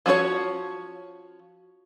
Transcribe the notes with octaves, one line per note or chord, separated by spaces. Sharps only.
F3 C#4 F#4 G#4 C#5